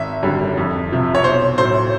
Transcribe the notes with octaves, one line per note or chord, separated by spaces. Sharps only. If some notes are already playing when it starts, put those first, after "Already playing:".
Already playing: G#1 E5
F#2 D3 G3
F2
C3 F3
C#5
B1 C5
A2 F#3 A3 C5